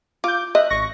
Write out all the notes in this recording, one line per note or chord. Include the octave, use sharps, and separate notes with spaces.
F4 D6 G6
D#5 E5 F#6
G#1 C#6 A#6